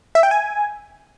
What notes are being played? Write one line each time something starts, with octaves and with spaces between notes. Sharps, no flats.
E5
G5
G#5